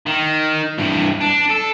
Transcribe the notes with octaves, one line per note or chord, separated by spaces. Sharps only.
D#3
G2 E3
D4
A4